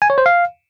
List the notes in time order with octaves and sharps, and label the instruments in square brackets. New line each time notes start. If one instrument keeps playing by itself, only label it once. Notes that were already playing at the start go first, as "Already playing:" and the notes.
[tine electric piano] G#5
C#5
C5
F5